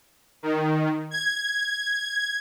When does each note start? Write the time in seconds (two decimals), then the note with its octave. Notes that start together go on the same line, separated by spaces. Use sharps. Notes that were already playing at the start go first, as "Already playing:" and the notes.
0.43 D#3
1.11 G#6